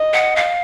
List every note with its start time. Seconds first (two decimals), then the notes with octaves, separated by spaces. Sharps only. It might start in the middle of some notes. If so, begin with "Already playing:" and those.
Already playing: D#5
0.13 F#5
0.36 F5